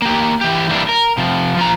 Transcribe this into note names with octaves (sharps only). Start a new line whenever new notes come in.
A#3 G4
E3 G4
E3 G3 A#3 D4
A#4
C3 F3
F3 F4 A#5